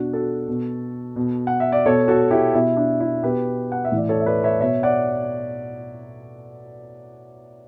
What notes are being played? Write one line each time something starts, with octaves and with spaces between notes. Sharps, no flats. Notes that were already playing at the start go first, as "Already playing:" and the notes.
Already playing: B2 D4 F#4
F#4 A4
B2
B2
F#5
E5
D5
B2 A4 C#5
F#4 A4
E4 G4
B2 E4
D4
E4
B2 G4 B4
F#5
E5
A2 E3 D5
A4 C#5
E5
B4 D5
C#5 E5
B2 C#5 E5
D5 F#5